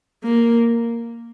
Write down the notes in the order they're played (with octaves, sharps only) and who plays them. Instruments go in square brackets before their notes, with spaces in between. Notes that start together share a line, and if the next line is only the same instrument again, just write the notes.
[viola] A#3